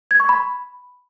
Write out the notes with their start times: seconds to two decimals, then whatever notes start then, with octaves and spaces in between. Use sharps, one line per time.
0.11 G#6
0.20 C#6
0.29 B5